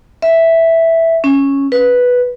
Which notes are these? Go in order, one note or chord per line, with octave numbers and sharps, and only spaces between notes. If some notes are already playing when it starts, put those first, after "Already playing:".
E5
C#4
B4